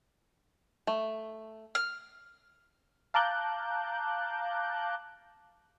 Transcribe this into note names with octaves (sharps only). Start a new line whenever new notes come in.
A3
F6
F5 A5 A#5 D6 F#6 G6